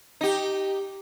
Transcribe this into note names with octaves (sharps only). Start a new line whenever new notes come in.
D#4 G4